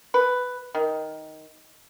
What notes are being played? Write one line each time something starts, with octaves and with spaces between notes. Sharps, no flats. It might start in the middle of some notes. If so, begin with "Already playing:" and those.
B4
D#3